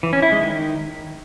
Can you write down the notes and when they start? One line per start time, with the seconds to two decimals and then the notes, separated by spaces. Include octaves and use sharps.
0.03 E3
0.13 C#4
0.22 E4
0.32 G#3
0.42 D#3